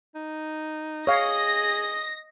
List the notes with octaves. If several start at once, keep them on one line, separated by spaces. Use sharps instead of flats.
D#4
G#4 C#5 D#5 F5 A#6